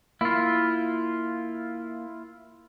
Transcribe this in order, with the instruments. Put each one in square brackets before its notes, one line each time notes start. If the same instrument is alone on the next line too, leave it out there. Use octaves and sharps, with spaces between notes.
[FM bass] A#3 [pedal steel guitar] E4 F4